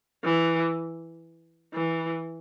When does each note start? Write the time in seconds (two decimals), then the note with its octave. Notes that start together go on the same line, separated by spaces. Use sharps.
0.25 E3
1.74 E3